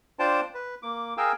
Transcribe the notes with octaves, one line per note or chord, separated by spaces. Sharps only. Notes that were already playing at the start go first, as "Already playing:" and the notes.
D4 F4 C5 D5 G5 A5
B4
A#3 D6
G#4 A#4 F5 G5 G#5 E6